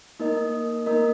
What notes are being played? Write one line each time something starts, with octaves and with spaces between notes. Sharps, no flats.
A#3 D#4 A#4 D#5
A#3 D#4 A#4 D#5